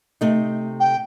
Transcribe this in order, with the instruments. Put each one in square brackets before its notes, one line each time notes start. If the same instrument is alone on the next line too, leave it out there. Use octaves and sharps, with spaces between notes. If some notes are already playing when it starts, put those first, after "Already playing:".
[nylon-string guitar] C3 A3 D#4
[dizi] G5